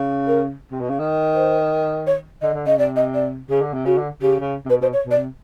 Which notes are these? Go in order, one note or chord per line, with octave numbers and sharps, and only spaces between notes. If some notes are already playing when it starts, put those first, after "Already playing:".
Already playing: C#3
A#4
C3
B2
C#3
D#3
C5
C#5
D3 D#5
D3
C#3 D#5
C3 D5
D#5
D5
C#3 G#4
D3
C3
C#3 F#4
D3
C#3 G4
C#3
C3
B2 B4
B2 C5
C#5
B2
D5
C3